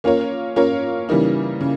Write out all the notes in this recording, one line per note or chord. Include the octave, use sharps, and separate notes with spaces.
A#3 C#4 F4 A#4 C#5
A#3 C#4 F4 A#4 C#5
C#3 E3 G3 A#3 D#4
C#3